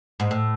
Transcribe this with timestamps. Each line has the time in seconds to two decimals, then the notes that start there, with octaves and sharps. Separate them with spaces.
0.20 G#2
0.31 A2